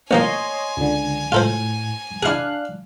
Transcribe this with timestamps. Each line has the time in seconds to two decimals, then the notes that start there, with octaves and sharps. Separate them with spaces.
0.11 A1 F3 A#3 C#5 D#5 G#5 C6
0.77 C#2 D3
1.32 A2 F4 A4 C5
2.23 D4 E4 G#4 F5 F#6